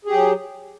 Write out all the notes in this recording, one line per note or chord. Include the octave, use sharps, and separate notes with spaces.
F#3 G4 G#4